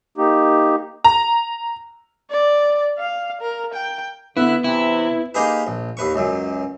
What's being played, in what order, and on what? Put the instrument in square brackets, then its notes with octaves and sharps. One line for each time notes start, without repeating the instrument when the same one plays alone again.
[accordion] A#3 D#4 G4
[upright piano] A#5
[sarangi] D5
F5
A#4
G5
[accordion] D3 E5 F#6 [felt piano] B3 [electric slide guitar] E4
[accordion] C3 E3 C4 [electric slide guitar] E4
[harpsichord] A#3 D#4 G4 G#4 B4
A#1
D#2 B4 C#6
C#2 F#2